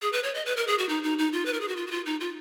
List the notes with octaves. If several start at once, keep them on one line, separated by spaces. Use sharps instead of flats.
G#4
B4
C#5
D#5
B4
A#4
G#4
F#4
D#4
D#4
D#4
F4
B4
A#4
G#4
F#4
F4
F#4
F4
D#4
F4